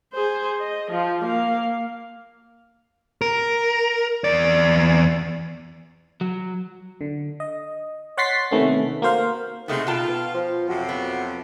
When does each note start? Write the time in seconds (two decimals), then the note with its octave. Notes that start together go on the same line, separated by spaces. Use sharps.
0.13 G#4 C5
0.60 D#5
0.90 F3 F4
1.25 A#3 F5
3.21 A#4
4.24 E2 D5
6.21 F#3
7.01 D3
7.40 D#5
8.17 C#5 F#5 C6 A6 B6 C7
8.51 C3 D#3 A3 B3 C#4
9.02 A#3 F#4 C5 F5
9.68 C3 D#3 G#3 A3 B3 D#5
9.87 B2 F4 G5 A5
10.08 B3
10.34 F3
10.69 F2 C3 F#3 F#4
10.89 B3